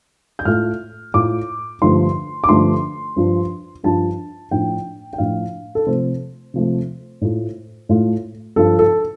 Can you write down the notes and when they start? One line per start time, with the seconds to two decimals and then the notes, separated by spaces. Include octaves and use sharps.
0.39 G6
0.45 A2 A3 F4 F6
1.14 A2 A3 F4 D6
1.82 G2 D3 F3 A3 D4 C6
2.44 D6
2.49 G2 D3 F3 A3 D4 C6
3.16 G2 F3 D4 F4
3.84 G2 F3 D4 F4 A5
4.51 A2 F3 D4 F4 G5
5.13 G5
5.18 A2 F3 D4 F4 F5
5.75 A4
5.86 C3 F3 A3 C5
6.54 C3 F3 A3
7.21 A2 A3 F4
7.89 A2 A3 F4
8.56 G2 F3 D4 F4 A4
8.79 A4